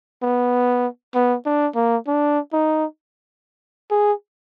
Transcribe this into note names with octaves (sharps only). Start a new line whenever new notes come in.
B3
B3
D4
A#3
D4
D#4
G#4